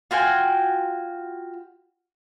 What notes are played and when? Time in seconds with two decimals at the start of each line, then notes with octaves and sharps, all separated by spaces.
0.11 F4 F#4 G5 G#5